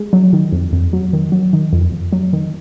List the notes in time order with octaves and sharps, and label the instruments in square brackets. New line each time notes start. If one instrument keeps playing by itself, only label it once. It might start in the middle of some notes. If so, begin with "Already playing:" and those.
Already playing: [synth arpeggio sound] G#3
F#3
D#3
F2
F2
F#3
D#3
F#3
D#3
F2
F2
F#3
D#3